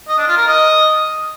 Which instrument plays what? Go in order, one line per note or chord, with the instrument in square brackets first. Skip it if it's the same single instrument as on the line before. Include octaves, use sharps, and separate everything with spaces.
[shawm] D#5
D4
F4
A#4
D#5